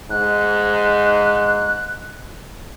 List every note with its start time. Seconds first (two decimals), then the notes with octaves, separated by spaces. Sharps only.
0.10 G#2 F#6